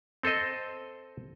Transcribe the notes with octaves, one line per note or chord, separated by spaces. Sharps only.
C4 A4 C5 D#5